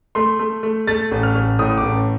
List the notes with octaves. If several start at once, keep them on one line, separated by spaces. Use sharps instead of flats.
A3 C6
A3
A3
A3 A6
A1
F6
A1
A2 D#6
D6
A1